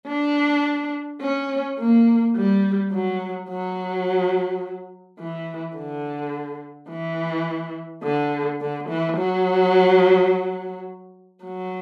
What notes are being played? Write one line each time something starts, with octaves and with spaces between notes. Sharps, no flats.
D4
C#4
A#3
G3
F#3
F#3
E3
D3
E3
D3
D3
E3
F#3
F#3